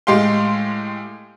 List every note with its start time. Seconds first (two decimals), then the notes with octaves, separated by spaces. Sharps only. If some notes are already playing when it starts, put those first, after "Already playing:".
0.07 A2 G#3 G4 F5 C6